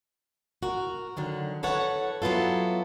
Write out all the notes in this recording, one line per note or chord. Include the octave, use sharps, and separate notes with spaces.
F#4 A#4
D3 D#3 F#3
E3 A4 B4 C#5 F#5
F#3 B3 E4 F4 A4